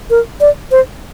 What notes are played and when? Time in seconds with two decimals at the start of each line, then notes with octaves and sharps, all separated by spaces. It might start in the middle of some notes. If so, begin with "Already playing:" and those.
0.10 A#4
0.41 D5
0.71 C5